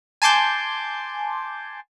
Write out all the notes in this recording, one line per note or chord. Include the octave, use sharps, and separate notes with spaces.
G#5 A5 C6 D6 G6